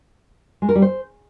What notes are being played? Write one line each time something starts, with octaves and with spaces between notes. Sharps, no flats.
G#3
A#4
G3
C5